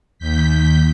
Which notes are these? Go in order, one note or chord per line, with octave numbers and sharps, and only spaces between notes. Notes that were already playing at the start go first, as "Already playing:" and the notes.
D#2 G6 B6